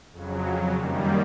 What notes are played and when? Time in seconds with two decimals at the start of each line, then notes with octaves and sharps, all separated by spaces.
0.12 F2 C#3 F#3
0.74 F#2 D#3 G3 A#3